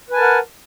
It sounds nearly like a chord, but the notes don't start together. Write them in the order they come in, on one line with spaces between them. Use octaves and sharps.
B4 G#5 A5 A#4 F#5